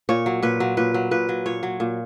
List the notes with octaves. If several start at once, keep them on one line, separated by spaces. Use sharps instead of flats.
A#2 C#5
F#3
A#2 B4
F#3
A#2 B4
F#3
A#2 B4
F#3
A#2 C#5
F#3
A#2